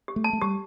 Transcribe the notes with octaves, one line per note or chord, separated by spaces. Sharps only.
G4
A3
A5
A3
G3 G4